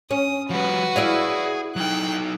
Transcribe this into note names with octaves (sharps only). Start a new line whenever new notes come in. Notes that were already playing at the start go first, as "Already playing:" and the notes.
C#4 D#6
F3 G3 F#4 B4
E4 G#4 D5 F5
F#3 D#4 G5 F#6